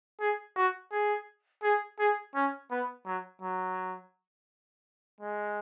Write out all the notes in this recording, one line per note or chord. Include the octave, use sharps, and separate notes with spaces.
G#4
F#4
G#4
G#4
G#4
C#4
B3
F#3
F#3
G#3